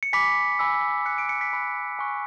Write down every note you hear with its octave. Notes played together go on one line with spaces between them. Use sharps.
C#7
G#5 B5 D6 B6
G#5 B5 E6
B5 F#6 C#7
D7
C#7
B6
B5 F#6
G#5 C#6 F#6